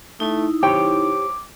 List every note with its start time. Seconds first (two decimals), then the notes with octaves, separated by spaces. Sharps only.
0.20 A3 D#4 E4
0.63 G4 C5 C#5 G5 D6